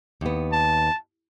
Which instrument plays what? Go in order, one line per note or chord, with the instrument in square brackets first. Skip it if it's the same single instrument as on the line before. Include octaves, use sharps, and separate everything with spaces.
[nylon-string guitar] D#2 B3
[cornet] A5